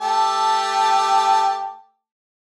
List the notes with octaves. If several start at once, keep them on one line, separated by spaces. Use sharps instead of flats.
A3 G4 A5